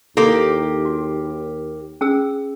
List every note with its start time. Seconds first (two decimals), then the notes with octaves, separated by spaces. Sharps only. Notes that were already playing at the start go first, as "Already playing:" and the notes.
0.17 D#2 A#3 E4 G4 A4 C6
0.85 F#4
2.01 C#4 G#4 E6